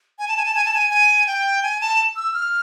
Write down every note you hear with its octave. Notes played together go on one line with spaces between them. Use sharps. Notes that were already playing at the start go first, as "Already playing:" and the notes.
G#5
A5
G#5
A5
G#5
A5
G#5
G#5
G5
G#5
A5
E6
F6